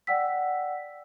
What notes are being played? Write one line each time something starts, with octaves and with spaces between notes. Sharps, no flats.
D5 F#5 G5 E6 B6